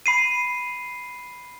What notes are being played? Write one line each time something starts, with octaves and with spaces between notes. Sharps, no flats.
B5 C7 D#7